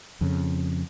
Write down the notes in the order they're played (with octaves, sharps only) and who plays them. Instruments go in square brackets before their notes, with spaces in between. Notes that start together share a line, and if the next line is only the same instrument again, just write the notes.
[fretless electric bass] F2 C#3